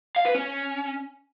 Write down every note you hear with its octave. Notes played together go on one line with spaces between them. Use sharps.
F5
B4
C#4